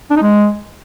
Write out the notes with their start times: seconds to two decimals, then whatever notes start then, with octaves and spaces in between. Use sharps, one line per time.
0.11 D4
0.16 D#4
0.22 G#3